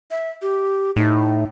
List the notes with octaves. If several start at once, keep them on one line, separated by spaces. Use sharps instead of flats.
E5
G4
A2 D#4